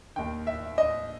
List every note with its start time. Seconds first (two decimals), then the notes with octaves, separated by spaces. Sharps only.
0.16 D#2 D#3 G5
0.47 E5
0.78 D#5